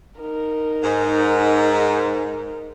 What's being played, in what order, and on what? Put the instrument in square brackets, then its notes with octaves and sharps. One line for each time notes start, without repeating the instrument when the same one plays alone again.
[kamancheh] D#4 A#4
[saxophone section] G#2